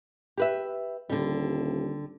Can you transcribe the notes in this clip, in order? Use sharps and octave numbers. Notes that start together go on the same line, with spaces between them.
G4 B4 E5
D#1 D3 G3